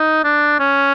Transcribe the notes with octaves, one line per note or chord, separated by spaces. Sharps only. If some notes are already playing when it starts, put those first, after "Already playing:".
Already playing: D#4
D4
C#4